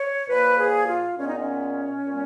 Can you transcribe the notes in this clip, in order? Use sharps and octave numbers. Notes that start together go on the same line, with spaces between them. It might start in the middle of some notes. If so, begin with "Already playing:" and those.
Already playing: C#5
A#2 F3 A#3 B4
G#4
F4
A#2 G#3 B3 C#4
D#4
C#4
A#2 G#3 B3